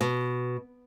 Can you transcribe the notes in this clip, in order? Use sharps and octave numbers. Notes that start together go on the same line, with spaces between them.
B2